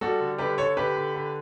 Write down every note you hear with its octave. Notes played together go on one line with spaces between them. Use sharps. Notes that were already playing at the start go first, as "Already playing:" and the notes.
G3 F#4 A4
D3
D3 G4 B4
D3 A4 C#5
D3 G4 B4
D3
D3